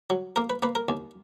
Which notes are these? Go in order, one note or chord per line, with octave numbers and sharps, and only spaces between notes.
F#3
A#3 A#4
B4
A#3 B4
A#4
D#2